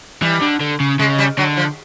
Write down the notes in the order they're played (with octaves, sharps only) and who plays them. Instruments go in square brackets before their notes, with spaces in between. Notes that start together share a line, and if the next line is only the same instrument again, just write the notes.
[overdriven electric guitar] E3 [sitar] G3
[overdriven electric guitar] D3
D3
C#3
[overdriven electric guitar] C#3 [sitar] G#3
[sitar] G3
[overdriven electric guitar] D3 [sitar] F#3
[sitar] F3